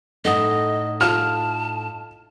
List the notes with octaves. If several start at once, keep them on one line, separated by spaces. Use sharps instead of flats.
A2 D#4 A4 D#5 F#5 D#6
F4 A5 F6